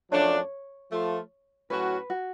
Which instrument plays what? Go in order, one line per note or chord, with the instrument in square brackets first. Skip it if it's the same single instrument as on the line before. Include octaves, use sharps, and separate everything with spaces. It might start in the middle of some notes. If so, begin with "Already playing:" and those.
[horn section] F#2 F3 A3 D4 [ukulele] C#5
[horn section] F3 A3 F4
[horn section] A2 F#3 C#4 F#4 [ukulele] B4
[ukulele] F#4